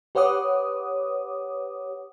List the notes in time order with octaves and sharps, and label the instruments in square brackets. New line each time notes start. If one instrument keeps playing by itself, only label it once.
[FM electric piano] G4 B4 C#5 F#5 D6 D#6